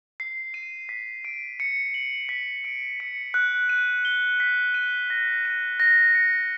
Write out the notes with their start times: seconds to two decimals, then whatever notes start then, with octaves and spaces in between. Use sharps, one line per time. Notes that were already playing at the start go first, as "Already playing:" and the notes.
0.20 C7
0.54 D#7
0.89 B6
1.25 D7
1.60 C#7
1.94 F#7
2.29 B6
2.64 D7
3.00 C#7
3.34 F#6
3.69 D#7
4.05 G7
4.40 B6
4.74 D#7
5.10 A#6
5.45 D#7
5.80 A#6
6.15 C#7